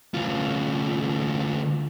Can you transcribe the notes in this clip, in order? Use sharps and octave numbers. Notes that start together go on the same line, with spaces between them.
D2 F4